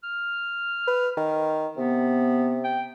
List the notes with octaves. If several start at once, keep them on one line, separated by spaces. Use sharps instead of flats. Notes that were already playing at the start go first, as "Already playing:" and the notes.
F6
B4
D#3
C3 B3
G5